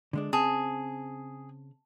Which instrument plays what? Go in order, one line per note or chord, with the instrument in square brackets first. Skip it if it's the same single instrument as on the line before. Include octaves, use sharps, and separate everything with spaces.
[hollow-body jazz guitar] D3 G#3 D4
[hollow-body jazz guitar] C#3 C4 [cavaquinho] G#4 [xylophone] A5